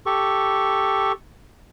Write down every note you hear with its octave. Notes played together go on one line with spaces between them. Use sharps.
G4 A4 C#6